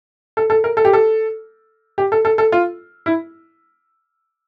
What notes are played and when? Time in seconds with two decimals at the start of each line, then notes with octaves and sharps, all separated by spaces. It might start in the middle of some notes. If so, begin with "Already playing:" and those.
0.37 A4
0.50 A4
0.64 A#4
0.77 A4
0.85 G4
0.93 A4
1.98 G4
2.12 A4
2.25 A4
2.38 A4
2.52 F4
3.06 E4